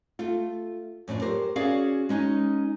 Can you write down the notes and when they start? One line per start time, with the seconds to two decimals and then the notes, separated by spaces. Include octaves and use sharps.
0.19 A3 F4
1.08 F#2 A2 F3 D4
1.21 G4 A#4 C5
1.56 C#4 F#4 G#4 D5 F5
2.09 G#3 C#4 D#4